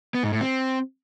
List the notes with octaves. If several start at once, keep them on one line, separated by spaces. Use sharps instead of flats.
B3
G#2
A2
C4